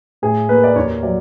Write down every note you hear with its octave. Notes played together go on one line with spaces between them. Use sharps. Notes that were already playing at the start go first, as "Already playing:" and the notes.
A2 G#4
A#3 B4
D5
D#2 C#5
F#3 D5